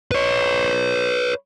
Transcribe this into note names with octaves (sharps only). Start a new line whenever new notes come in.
B4 C#5